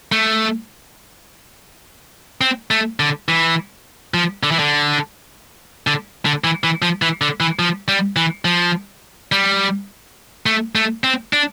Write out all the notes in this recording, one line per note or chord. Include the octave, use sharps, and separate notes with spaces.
A3
C4
A3
D3
E3
F3
D3
E3
D3
D3
D3
E3
E3
F3
E3
D3
E3
F3
G3
E3
F3
G3
A3
A3
C4
D4